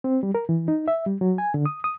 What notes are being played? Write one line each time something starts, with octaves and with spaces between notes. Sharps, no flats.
C4
G3
A#4
E3
D#4
E5
G3
F#3
G#5
D3
D#6
D#6